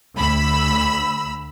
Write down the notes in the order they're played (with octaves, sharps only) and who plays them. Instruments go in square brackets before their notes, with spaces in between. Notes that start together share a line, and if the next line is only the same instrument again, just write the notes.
[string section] D2 B5 E6